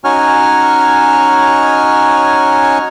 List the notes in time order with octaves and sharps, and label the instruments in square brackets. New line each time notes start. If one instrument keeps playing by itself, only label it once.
[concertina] C#4 D#4 F#4 C#5 G#5 F6